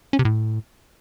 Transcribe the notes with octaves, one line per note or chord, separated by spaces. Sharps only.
C#4
C3
A2